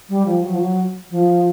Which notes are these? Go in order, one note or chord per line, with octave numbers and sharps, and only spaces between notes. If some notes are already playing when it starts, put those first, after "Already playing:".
G3
F3
F#3
F3
F#3
F3